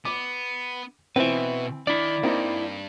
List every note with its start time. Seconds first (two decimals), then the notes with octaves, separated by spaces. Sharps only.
0.05 B3 D6
1.16 B2 E3 C4 B4 E5
1.87 D#3 D4 E4 D5
2.23 G2 A#3 C4 D#4